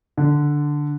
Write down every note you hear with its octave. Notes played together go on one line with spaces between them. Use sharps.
D3